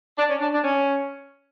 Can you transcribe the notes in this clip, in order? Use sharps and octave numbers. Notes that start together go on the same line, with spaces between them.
D4
C#4
D4
D4
C#4